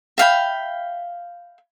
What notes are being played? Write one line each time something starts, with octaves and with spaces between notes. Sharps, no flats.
E5 F5 G5 B5